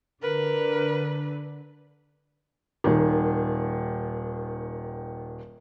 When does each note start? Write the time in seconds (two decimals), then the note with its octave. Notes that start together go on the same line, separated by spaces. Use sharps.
0.23 D3 A#4 B4
2.84 D#1 D#3